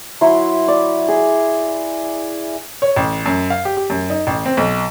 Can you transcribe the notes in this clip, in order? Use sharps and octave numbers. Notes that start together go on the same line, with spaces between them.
F#3 E4 C6
D5
G#4
C#5
A1
F#2
F5
G4
G4
F#2
D#4
A1
C4
B1